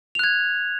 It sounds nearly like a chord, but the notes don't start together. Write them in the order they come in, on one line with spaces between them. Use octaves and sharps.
F7 F#6 G#6